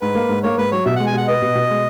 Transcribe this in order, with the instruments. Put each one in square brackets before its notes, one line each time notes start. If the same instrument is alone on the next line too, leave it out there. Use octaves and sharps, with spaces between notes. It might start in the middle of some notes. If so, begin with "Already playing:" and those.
[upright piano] G#2 [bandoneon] B4
[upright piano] A#3
G#2
[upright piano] A#3 [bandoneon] C#5
[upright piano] G#2 [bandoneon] B4
[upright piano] F#3 [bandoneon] C#5
[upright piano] B2 [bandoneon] E5
[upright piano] G#3 [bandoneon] F#5
[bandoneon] G#5
[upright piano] B2 [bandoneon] F#5
[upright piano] B3 [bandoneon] D#5
[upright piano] B2
B2
G#3